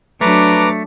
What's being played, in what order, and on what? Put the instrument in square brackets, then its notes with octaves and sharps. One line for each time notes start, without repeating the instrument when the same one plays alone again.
[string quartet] F#3 D4 [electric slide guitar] A3 [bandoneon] B4 A#5 D6